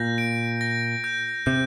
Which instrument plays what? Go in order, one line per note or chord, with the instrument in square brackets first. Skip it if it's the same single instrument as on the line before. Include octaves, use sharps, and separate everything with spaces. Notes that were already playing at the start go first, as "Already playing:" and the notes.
Already playing: [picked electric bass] A#2 [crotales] G6 A#6
[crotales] D7
A#6
G6
[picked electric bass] C3 [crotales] G6